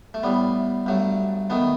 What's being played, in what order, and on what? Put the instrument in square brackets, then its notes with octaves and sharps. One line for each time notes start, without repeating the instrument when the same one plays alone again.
[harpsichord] A3
A2 G3 B3
G2 F#3 A3
D#3 A3 B3